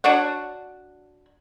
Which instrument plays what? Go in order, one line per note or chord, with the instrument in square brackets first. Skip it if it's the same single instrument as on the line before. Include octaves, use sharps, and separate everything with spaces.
[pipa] D4 F#4 C#5 F#5